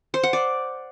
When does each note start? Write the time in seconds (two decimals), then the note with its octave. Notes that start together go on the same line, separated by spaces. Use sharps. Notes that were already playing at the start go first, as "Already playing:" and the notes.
0.14 C5
0.23 F#5
0.33 D5